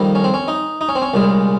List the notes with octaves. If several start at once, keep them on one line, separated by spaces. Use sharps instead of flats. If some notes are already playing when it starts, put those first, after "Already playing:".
Already playing: F2 D#3 G3 A#3
C#4
C4
C#4
D#4
D#4
C#4
C4
C#4
C2 A#2 G#3